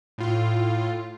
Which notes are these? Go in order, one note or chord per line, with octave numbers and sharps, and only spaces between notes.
A2 F4